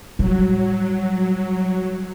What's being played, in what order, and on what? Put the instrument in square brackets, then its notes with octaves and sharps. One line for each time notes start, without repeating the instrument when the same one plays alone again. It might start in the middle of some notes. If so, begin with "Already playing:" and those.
[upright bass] A2 G3 [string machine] F#3